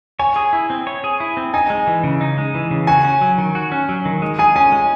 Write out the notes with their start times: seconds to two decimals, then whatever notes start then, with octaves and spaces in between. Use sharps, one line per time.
0.19 C#5 G#5
0.36 G#4
0.53 E4
0.70 C4
0.87 C#5
1.04 G#4
1.20 E4
1.37 C4
1.54 D#4 G#5
1.70 G#3
1.87 E3
2.04 C#3
2.21 D#4
2.38 G#3
2.54 E3
2.71 C#3
2.87 F#4 G#5
3.05 C#4
3.21 F#3
3.38 D#3
3.55 F#4
3.72 C#4
3.89 F#3
4.05 D#3
4.22 G#3
4.39 G#4 G#5
4.56 C#4 G#5
4.72 G#3